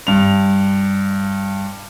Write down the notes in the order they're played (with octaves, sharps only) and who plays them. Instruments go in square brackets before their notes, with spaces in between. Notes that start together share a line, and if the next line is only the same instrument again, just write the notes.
[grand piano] G2 F7